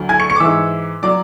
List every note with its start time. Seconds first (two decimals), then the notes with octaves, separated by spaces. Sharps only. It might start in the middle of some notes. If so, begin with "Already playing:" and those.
Already playing: D2 D3 F#3
0.09 G#5 G#6
0.19 C#6 C#7
0.30 C#6 C#7
0.36 D6
0.40 G#2 E3 E5 E6
1.03 F#3 D5 D6